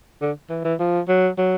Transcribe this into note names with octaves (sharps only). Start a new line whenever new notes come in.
D3
E3
E3
F3
F#3
F#3